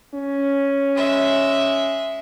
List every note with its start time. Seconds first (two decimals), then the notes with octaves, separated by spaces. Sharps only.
0.14 C#4
0.95 G#3 E5